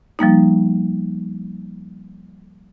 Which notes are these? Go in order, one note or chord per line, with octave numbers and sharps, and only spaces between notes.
F3 G3 A#3 D#4